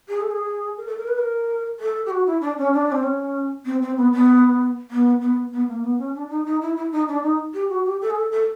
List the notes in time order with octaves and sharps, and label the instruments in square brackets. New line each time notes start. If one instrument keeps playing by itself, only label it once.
[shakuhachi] G#4
A4
G#4
A#4
A4
A#4
B4
A#4
A4
G4
F#4
E4
D4
C#4
D4
C4
C#4
C4
C4
B3
B3
B3
B3
B3
A#3
B3
C#4
D4
D#4
D#4
E4
E4
D#4
D4
D#4
G4
F#4
G4
A4
G#4
A4
A4